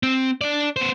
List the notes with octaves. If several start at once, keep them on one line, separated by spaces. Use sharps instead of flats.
C4
D4 D5
B3 C5